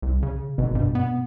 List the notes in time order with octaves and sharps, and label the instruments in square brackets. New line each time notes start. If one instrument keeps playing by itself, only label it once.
[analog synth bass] C2
C#3
[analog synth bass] G#1 [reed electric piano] B2
[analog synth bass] G2
B3